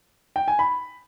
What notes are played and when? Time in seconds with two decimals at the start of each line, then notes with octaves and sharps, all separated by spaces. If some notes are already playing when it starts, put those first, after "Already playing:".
0.36 G5
0.48 G#5
0.59 B5